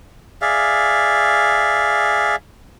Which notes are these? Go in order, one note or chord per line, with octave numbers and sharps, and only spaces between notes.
G#4 D5 E5 F5